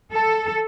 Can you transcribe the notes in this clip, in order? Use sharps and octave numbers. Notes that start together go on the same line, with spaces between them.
A4